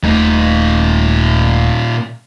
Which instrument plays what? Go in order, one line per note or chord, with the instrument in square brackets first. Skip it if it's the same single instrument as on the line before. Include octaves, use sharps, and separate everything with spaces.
[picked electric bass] D#1 A3 [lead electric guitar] A#2 D#4